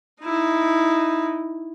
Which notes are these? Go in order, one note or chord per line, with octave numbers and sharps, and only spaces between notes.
D#4 E4